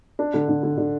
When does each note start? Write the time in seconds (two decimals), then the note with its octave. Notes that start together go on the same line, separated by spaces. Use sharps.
0.19 D4
0.34 D3
0.49 D3
0.63 D3
0.78 D3